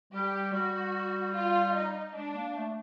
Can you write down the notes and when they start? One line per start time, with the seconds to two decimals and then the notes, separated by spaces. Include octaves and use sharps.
0.13 G3 G4
0.53 G3 F#4
1.34 F4
1.74 D#4
2.15 G#3 D4
2.35 A#3
2.56 A3